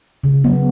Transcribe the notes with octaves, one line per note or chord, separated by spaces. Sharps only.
C#3
F#3 B3